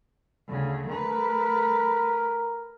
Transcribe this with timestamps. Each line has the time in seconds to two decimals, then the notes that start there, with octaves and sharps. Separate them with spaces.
0.49 D2 C#3
0.88 A3 A#4 B4